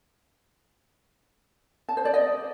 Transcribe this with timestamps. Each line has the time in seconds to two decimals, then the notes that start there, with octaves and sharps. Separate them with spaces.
1.89 A5
1.97 C5
2.05 D5
2.14 D#5